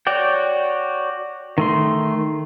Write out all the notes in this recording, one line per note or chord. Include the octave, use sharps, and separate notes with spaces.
F#4 C#5 D5 G5
D#3 A3 C6